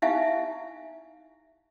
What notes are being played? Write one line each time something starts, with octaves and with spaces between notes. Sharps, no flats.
D#4 E4 G4 E5 F5 G#5